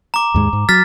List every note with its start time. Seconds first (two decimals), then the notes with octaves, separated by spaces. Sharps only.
0.14 A#5 D6
0.34 D#2 G#2 G#3
0.53 G#2
0.69 F#3 F6 A6 B6